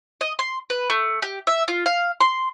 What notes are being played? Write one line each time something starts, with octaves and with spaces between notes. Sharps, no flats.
D#5
C6
B4
A3
G4
E5
F4
F5
C6